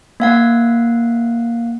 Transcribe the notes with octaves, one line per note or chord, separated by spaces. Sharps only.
A#3 F5 F#5